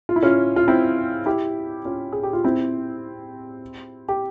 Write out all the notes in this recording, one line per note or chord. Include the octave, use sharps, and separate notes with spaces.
F4
E4
C#4 F4
F4
C4 E4
E4 G4
C#4 F4
G#4
G4
F4
C4 E4
G4